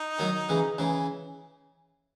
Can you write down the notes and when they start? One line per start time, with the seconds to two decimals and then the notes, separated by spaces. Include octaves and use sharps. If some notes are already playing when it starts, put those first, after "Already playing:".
Already playing: D#4
0.19 D#3 F#3
0.49 C#3 E3
0.78 C#3 E3